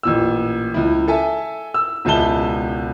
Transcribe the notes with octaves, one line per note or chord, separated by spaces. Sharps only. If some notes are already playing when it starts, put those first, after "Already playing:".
A1 A#2 E6
C#2 E4
A4 E5 G#5 A5
E6
E1 C#2 G#3 E5 A5 G7